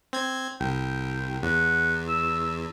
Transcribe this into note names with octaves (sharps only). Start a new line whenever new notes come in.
C4 G#6
C2 G5
E2 F#5
E6